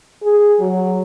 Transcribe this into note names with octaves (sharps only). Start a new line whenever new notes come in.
G#4
F#3